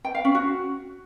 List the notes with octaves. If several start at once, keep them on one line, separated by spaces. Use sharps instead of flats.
G5
F5
C#4
F#4